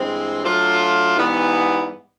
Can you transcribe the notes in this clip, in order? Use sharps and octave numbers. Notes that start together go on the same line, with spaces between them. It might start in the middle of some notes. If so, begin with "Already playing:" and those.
Already playing: G2 E3 G#3 C4
F#3 A3 D4 F4 A4
G#2 E3 G3 B3